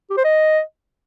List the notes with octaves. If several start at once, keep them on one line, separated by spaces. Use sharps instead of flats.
G4
C5
D#5